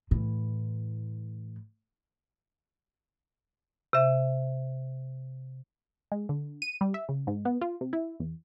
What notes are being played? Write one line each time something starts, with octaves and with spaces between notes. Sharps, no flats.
A2 E3
C3 E5
G#3
D3
D#7
G3
E5
C#3
G#2
B3
F4
C3
E4
E2